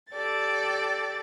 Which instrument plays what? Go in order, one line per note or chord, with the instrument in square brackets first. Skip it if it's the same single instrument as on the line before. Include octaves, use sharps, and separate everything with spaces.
[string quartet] G4 A4 D5 A6